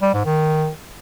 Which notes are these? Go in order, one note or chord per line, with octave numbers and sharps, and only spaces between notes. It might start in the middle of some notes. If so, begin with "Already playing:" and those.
G3
G#2
D#3